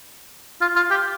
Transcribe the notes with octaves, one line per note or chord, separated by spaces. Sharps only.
F4
F4
G4